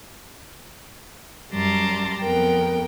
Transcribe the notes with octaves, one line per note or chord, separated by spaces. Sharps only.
F#2 G3 A5 A#5 C6 D6
F2 B3 A#4 G5